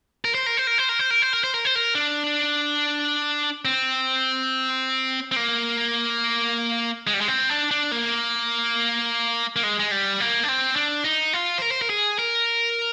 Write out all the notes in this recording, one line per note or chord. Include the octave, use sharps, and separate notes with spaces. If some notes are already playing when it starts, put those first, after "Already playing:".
A#4
C5
A#4
C5
A#4
C5
A#4
C5
A#4
C5
A#4
C5
A#4
C5
A#4
D4
C4
C4
A#3
G#3
G3
G#3
C4
D4
D4
A#3
A#3
G#3
G#3
G3
A#3
D4
C4
D4
D#4
F4
C5
A#4
C5
A#4
G#4
A#4